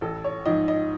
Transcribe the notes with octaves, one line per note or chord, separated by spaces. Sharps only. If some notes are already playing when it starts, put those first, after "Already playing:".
A1 A4
C#5
G#2 F3 D#5
D#5